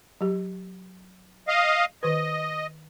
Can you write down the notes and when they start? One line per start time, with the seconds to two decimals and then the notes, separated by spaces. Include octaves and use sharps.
0.21 F#3 G4
1.48 D#5 F5
2.03 D#3 B4 D#5